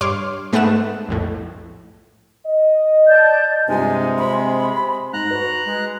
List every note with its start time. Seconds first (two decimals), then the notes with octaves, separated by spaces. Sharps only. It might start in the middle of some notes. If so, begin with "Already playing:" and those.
0.01 G2 C#5 C6 D6 F6
0.52 G#2 A3 B3 F#5 E7
1.09 B1 F2 A2
2.46 D#5
3.07 D5 A5 G6
3.68 G2 C3 G#3 F4 G#5
4.18 C4 B5 C6
5.13 G#2 A#5 F#6
5.31 F#4 B4
5.65 G#3